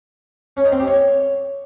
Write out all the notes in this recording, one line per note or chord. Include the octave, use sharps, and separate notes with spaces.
C#4
D#4
C4
G4
C#5